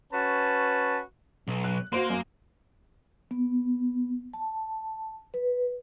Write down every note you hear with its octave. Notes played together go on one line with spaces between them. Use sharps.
C#4 F#4 B4 A5
B1
F#6
A#3 F#4 C5 C6
F#2
B3
A5
B4